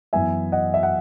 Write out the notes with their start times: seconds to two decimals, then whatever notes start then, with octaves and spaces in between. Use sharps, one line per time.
0.13 F#2 E3 B3 E5 G#5
0.52 D#5 F#5
0.74 E5
0.83 F#5